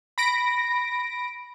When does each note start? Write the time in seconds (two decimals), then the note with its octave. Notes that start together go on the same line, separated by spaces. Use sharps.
0.18 B5 A#6 D7